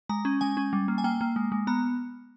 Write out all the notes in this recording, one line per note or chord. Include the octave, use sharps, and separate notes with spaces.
G#3 A#5
C#4
G#3 G#5
C#4
G3
A#3
G#5
A#3 G5
A#3
G#3
G#3
B3 A#5